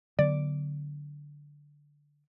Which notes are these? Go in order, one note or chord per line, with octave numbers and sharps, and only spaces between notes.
D3 F#3 B3 D5